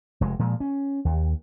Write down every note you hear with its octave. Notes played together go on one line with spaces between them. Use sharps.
F1 G#3
A#2 F3 G#3
C#4
D#2